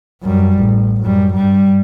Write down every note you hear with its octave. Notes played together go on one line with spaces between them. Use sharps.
F#2 G3
A1
F#2 G3
G2 G3